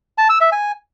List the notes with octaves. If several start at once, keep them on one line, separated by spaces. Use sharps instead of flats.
A5
E6
E5
G#5